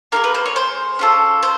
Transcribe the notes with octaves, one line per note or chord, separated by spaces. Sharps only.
A#3 D#4 G#4 A#4
B4
C5
C#5
C5
C#4 F4 A4
C5